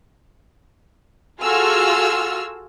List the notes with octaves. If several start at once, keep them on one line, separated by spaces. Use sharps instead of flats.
F4 F#4 G#4 A4 E6 F6